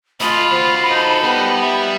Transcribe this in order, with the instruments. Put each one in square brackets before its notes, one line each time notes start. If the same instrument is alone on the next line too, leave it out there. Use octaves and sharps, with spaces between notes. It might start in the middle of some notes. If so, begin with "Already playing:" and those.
[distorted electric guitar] A3 D#5 [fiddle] F4 [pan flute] B5
[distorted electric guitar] F#4 C5
[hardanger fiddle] D#4 A4
[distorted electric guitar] G3 G4 [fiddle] B3
[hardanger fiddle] E5